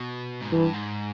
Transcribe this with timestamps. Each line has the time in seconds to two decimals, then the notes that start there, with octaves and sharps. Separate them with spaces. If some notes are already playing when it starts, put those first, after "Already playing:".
Already playing: B2
0.42 G#2
0.52 G2 E3
0.74 G#2